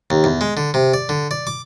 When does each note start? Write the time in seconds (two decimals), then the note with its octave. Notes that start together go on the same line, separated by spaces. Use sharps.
0.10 D#2
0.24 E2
0.41 G#3
0.57 D3
0.74 C3
0.94 D5
1.09 D3
1.31 D5
1.47 D6